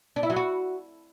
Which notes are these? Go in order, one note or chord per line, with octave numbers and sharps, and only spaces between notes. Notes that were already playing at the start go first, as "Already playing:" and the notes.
D4
E4
F#3
F#4